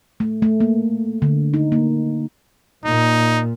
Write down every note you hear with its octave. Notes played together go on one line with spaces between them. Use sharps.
A3
A3
A#3
D3
D#4
A#3
A#2 D#4